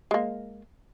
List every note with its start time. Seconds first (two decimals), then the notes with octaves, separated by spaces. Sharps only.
0.11 G#3 A#3